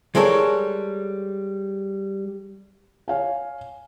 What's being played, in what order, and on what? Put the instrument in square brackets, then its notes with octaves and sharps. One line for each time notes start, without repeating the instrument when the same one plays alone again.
[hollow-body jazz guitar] G3 G#3 A4 A#4 C#5
[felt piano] C#5 F5 G#5